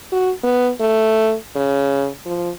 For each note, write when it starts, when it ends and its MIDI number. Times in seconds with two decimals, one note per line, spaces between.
0.12 0.31 66
0.44 0.70 59
0.81 1.34 57
1.56 2.08 49
2.26 2.50 53